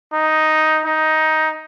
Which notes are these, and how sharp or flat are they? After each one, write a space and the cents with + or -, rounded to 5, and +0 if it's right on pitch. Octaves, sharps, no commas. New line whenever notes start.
D#4 +5
D#4 +10